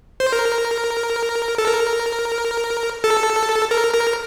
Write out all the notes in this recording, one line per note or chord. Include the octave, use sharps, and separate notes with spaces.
C5
A#4
A4
A#4
A4
A#4
A#4